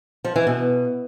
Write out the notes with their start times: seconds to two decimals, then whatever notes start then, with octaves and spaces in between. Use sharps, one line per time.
0.24 F3
0.36 E3
0.47 B2